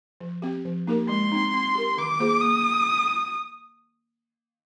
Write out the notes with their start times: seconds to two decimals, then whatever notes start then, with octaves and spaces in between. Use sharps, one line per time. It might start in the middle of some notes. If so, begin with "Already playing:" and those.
0.20 F3
0.42 C4 G4
0.65 F3
0.87 A#3 D#4 G4 A#4
1.09 G#3 C6
1.32 C4 D#4
1.54 C4
1.75 G4 A#4
1.98 D#3 D6
2.19 A#3 F4 G#4 C5
2.41 A#3 D#6